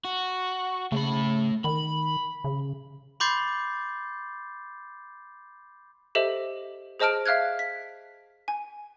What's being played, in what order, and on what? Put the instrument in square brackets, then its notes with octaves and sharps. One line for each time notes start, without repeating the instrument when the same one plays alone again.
[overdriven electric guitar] F#4
[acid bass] C#3 [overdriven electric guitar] A3 B5
[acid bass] D#3 [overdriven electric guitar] B5
[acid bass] C#3
[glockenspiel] B5 C6 D6 G6 A6 C7
[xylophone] G4 A4 C5 D#5 E5
G#4 C5 D#5 A5 F6 D7
E5 F5 F6 F#6 G#6
B6
G#5